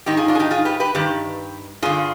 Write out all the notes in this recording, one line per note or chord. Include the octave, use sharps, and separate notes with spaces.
G#2 D#3 D#4 G4
F4 G#4
D4 F4
G#4
D#4 G4
F4 G#4
G4 B4
G4 B4
G2 D#3 G4 B4
G2 D3 F4 G#4